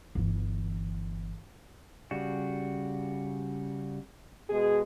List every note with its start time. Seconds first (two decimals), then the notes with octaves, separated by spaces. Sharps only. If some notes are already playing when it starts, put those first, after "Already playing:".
0.15 G1 E3
2.11 C#3 G3 F#4
4.50 B2 G#3 G#4